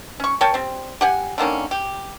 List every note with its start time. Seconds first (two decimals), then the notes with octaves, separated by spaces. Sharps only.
0.20 C#4 C#6
0.41 A#4 C#5 G5 A5
0.54 G3 C4
1.01 G4 F#5 G#5
1.38 D3 D#3 A#3 C#4
1.71 G4